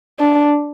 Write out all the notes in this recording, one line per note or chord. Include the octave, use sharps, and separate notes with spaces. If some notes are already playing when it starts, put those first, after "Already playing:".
D4